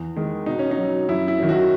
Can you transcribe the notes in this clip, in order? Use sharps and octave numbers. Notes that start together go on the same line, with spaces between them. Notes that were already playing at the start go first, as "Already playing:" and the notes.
Already playing: E2
D#3 G#3
B2 D#4
C#4
D#4
F#3
F#2 E4
E4
D#3 F#3
F#4